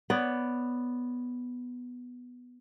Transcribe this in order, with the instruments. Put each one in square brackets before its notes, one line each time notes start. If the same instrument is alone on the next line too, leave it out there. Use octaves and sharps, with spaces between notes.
[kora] B3 C#5 D5